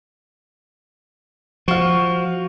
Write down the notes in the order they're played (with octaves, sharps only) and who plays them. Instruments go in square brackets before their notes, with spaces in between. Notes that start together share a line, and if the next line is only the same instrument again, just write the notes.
[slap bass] F3 [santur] F#4 F5